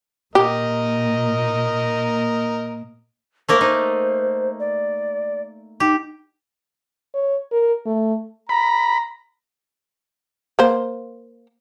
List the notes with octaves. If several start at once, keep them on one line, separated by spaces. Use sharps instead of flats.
A#2 A#3 G4 A#4 D#5
A3 A#3 A#4 C5
D#4 C5
D5
D#4 G4
C#5
A#4
A3
A#5 B5
A#3 C5